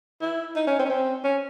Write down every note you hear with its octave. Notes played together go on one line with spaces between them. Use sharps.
E4
D#4
C#4
C4
C#4
C4
C#4